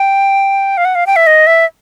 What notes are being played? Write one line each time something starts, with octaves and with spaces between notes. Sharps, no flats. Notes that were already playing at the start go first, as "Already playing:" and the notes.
Already playing: G5
F5
F#5
F5
G5
E5
D#5
E5